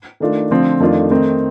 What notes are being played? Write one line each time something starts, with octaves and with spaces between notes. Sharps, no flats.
D#3 A3 D4 F4
D3 F3 A3 C4 F4
F2 D#3 A3 D4 F4
D#3 A3 C4 D#4